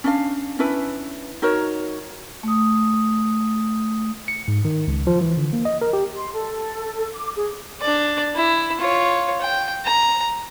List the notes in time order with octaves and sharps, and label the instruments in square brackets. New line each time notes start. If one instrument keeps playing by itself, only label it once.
[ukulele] C#4 D4 F5
C#4 D4 E4 B4
D#4 F#4 A#4 C#5
[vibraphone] A3 D#6
[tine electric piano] C#7
G#2
D#3
C#2
F3
E3
D3
A#3
D#5
A#4
G4
[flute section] C6
A4
D6
G#4
[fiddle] D4 D5
E4
F4 C#5
G5
A#5